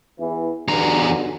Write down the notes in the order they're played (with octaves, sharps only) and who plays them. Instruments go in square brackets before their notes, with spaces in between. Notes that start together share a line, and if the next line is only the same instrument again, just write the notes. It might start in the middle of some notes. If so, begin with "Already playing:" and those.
[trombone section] E2 E3
[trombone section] B1 G2 D3 [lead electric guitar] E2 A#5